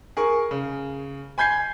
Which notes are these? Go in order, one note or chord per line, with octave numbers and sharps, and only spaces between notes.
G#4 A#4 C#6
C#3
G#5 B5 G6 G#6 C7